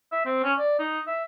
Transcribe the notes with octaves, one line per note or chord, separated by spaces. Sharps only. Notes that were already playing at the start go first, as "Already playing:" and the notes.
E5
C4
C#4
D5
D#4
E5